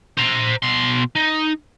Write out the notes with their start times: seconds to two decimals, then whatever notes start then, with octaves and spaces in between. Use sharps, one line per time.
0.18 C5 A#5
0.62 B2 C6
1.16 D#4